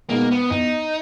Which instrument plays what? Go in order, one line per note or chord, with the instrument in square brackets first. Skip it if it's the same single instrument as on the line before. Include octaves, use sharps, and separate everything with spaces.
[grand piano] B2 G#3 B3 D#4 [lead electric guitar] A#3
[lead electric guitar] B3
[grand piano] E2 [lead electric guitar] D#4